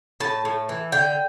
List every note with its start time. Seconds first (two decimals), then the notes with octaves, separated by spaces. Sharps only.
0.20 A2 A5
0.45 A2
0.69 E3
0.92 D3 G5